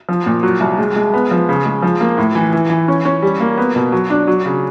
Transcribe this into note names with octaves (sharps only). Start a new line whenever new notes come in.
F3
A#2
F#3
C2
G#3
G#3
B3
F3
C#3
G#3
F3
A#3
A2
E3
E3
E3
C#4
C#4
G3
A#3
B3
B2
F#3
D4
F#3
C#3